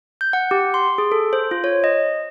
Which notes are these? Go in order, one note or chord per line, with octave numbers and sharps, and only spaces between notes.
G6
F#5
G4
C6
G#4
A4
C5
F4
C#5
D#5